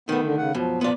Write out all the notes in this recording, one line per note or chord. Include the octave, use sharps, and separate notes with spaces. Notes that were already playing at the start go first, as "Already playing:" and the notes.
D#3 A3 B3
D3
C#3 F#5
F#2 B2 F3
A#2 F3 B3 F4 D5